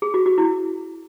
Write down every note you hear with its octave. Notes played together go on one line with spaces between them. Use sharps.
G#4
F#4
F#4
E4